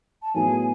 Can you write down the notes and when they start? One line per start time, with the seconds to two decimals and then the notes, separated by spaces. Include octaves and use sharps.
0.22 A5
0.34 A2 F#3 B3 G#4 G#5
0.59 G#5